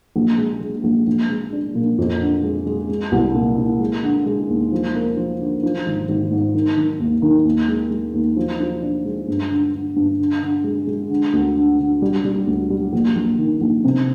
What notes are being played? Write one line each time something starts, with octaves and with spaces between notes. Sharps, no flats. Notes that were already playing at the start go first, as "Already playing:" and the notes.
A#1
G#3
G#3
A#1
A#1
G#3
D4
A#2
F2
D3
G#3
G#3
G#3
C2
A#2
A#2
G#3
D3
G#3
D#2
F3
A#3
F3
D3
F3
G#1
G#1
G#2
D#3
D#3
D#2
D#3
D#2
G#3
G#3
D#2
F3
F3
D4
G#3
G2
D3
D3
G2
D3
D3
G#3
G#3
D3
D2
D3
D3
G3
G3
D2
G3
A#1
A#1
D#3
A#1
C3